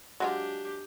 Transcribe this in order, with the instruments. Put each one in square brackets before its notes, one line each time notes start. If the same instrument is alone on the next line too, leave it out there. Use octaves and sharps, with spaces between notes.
[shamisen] F#3 G#3 F4 [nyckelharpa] D4 G4